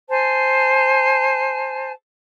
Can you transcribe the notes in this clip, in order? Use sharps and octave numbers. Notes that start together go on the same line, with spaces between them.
C5 G#5 A5